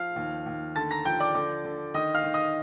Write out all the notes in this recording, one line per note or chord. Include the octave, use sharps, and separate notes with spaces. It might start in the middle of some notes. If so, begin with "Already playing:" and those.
Already playing: F3 F5 F6
D#2
D#2
D3 A5 A6
A#5 A#6
F3 G5 G6
D5 D6
D3 D5 D6
D3
D#3 D#5 D#6
F5 F6
D#3
D#5 D#6